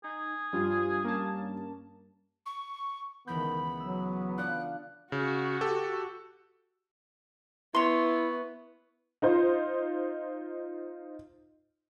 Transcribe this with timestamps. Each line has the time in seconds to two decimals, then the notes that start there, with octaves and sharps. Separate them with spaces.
0.04 D#4 G#4
0.53 G2 F3 G3 F4
1.04 A#3 C#4 A5
2.46 C#6
3.27 C#2 D#3 E3 B3 B5 G6
3.80 F#3 E6
4.38 D4 F4 D5 F#6
5.12 C#3 F#4
5.61 G4 A4
7.75 B3 E4 C#5 C6
9.22 D#4 F4 C5